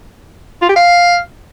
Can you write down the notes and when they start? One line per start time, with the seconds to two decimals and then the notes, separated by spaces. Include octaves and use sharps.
0.62 F4
0.69 G4
0.76 F5